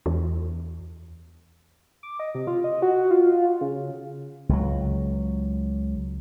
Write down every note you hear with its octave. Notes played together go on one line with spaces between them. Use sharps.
E2
D6
D#5
C3
F4
D#5
F#4
F4
C#3
C#2 F#3